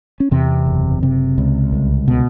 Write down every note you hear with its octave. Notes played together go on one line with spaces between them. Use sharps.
C#4
E2 C3 C4
F#1
C3
C#2
C2
B2